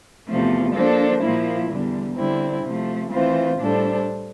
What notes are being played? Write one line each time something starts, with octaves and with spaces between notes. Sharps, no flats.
E2 C3 F3 A3
F3 A#3 D4 A4 C5
A#2 F3 A#3 E4
E2 D3 G3
D3 G3 C4 E4
C3 F3 A3
E3 A3 C4 F4 C5
A2 G3 D4 A4 C5